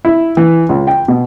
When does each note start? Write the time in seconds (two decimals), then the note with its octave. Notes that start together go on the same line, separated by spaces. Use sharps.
0.05 E4
0.37 E3
0.69 C#2
0.87 G5
1.08 B2